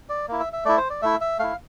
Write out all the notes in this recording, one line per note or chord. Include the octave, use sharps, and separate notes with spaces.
D5
A#3 E4
E5
E5
A3 E4 D5
C5
D5
A3 E4 E5
E5
A3 E4 F5